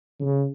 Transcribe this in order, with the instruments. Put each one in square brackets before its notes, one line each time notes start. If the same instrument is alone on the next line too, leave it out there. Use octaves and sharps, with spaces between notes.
[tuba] C#3